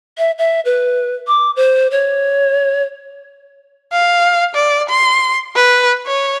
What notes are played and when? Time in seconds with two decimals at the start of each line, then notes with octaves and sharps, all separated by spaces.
0.18 E5
0.38 E5
0.65 B4
1.27 D6
1.56 C5
1.91 C#5
3.92 F5
4.55 D5
4.89 C6
5.55 B4
6.07 C#5